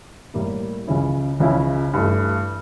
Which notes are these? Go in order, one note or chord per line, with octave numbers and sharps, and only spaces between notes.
A2 G3 A#3 E4
C#2 C#3 F3 C#4 E4
C#2 C#3 F3 C#4 E4
G2 E3 A3